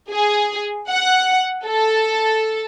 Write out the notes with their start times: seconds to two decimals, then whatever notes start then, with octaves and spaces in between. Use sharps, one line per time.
0.11 G#4
0.89 F#5
1.66 A4